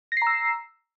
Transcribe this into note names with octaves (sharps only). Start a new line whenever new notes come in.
A#5 E6 A#6 C7